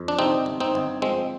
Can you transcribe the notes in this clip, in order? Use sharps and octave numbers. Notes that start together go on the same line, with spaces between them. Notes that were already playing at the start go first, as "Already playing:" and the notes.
Already playing: F2
D4
C3 C4 D#4
G1
C4 D#4
G1
F3 G#3 C4